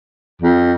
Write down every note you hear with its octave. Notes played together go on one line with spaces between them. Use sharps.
F2